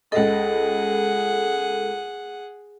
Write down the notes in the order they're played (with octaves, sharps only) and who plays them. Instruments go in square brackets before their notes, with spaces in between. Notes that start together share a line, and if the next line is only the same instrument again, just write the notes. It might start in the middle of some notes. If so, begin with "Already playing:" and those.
[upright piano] C#2 D#5 [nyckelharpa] G#4 F#5 [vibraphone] A4